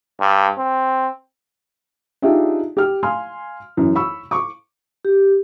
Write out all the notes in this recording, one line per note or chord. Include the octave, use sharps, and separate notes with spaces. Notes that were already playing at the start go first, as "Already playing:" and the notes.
G2
C4
D4 D#4 F4 G4 G#4 E5
G4 F6
F5 G#5 C6 F6
F#2 E3
B5 C#6 E6
C#6 D6
G4